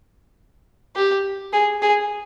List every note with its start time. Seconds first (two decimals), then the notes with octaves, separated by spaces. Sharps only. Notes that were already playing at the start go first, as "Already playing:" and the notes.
0.96 G4
1.53 G#4
1.82 G#4